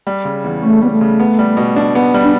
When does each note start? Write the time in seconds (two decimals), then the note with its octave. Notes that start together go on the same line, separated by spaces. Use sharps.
0.07 G3
0.25 C#3
0.44 E2
0.63 A3 C#4
0.82 G3 B3
0.91 A3
1.01 C#3
1.20 B3
1.39 G3
1.57 B2
1.76 D4
1.95 B3
2.14 G3
2.23 D4